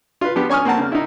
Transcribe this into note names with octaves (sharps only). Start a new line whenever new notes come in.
F4 B4
F3 B3 G4
C#4 G#5 C#6 D#6 F6
A#3 C4 F#5 A5
C#3
D#4 E4